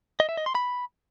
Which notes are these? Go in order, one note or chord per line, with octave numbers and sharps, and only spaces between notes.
D#5
E5
D#5
C6
B5